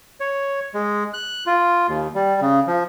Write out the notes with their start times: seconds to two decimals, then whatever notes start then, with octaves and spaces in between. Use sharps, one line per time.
0.20 C#5
0.74 G#3
1.14 F#6
1.46 F4
1.88 D#2
2.15 G3
2.41 C#3
2.67 F3